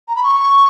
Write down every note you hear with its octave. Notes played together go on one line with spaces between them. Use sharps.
A#5
B5
C#6